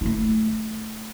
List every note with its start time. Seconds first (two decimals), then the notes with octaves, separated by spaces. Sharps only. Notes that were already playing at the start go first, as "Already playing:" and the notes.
0.01 A3 E4